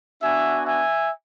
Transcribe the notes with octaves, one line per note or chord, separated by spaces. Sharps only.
B3 D4 F#4 E5 G#5
E5 G#5